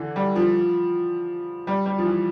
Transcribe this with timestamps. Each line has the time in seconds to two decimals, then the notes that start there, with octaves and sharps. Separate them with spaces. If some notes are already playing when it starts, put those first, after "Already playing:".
Already playing: D3 E3
0.16 G3
0.36 F3
1.67 G3
1.86 G3
1.98 F3
2.05 E3